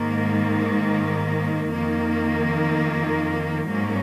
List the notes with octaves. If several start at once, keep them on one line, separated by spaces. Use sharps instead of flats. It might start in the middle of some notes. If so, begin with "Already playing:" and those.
Already playing: G#2 D#3 A#3
F2 D#3 A#3
G#2 F#3 A#3 C#4